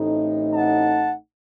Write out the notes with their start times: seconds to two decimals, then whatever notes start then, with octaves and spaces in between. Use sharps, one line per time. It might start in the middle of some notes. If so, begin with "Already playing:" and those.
Already playing: A1 A2 A3 C4 D#4
0.53 F#5 A5